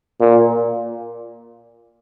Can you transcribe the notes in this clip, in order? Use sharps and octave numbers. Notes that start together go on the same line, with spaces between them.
A#2